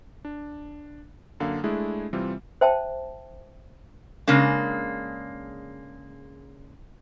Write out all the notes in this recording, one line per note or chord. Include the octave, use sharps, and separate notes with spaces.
D4
F#2 D3 A#3 F5
G#3 A3 D4 E4 G#4
C3 E3 G3 C4 F4
C5 E5 G5 A5
C#3 G#3 A#3 D4